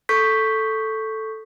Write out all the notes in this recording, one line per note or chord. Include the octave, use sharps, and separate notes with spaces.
A4 C#6 G6 B6